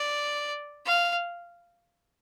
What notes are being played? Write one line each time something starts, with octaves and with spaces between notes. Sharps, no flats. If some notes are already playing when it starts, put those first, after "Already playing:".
Already playing: D5
F5